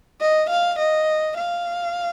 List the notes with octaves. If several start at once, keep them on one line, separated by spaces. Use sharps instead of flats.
D#5
F5
D#5
F5